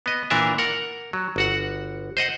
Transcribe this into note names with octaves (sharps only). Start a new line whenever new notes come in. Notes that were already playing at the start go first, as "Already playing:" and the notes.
B3 D#5
A#2 E3 D4 A#4 E5
A#4 F#5
F#3
G1 F#4 F#5
C5 D#5 F#5